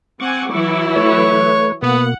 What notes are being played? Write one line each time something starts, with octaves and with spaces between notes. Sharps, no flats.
C4 F#5 G#5 C#6 D6
E3 F#3 E4
A3 B4 C#5
B2 A#3 B3 F#5